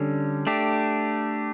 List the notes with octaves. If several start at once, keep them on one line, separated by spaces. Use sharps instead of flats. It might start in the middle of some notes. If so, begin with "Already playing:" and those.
Already playing: D3 G3 C#4
A3 D4 G4